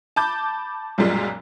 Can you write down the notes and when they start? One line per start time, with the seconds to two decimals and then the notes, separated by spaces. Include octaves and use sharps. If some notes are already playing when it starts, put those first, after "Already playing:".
0.16 A5 B5 D6 G6
0.98 B1 F#2 A#2 G3 G#3